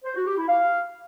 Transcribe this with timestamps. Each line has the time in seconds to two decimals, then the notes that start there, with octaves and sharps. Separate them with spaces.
0.04 C5
0.15 F#4
0.26 G4
0.37 E4
0.48 F5